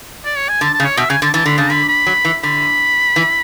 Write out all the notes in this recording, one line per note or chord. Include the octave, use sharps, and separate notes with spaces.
D5
C#5
G#5
D3 A5
A5
C#3
C#5
B2 E5
C#3 G#5
D3 A5
E3 A5
D3 B5
C#3 A5
D3 B5
B5
F#3
E3
D3 B5
E3